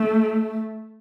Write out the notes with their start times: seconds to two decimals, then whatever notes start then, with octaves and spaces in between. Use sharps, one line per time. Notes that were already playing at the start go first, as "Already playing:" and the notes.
Already playing: A3